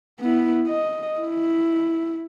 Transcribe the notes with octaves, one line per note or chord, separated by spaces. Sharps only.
B3 E4
D#5
E4